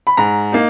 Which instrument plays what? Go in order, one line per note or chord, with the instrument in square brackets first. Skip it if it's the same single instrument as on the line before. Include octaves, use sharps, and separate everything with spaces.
[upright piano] B5
G#2 A#5
A#3 D#4